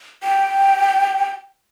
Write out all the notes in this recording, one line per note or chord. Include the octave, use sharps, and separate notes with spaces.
G5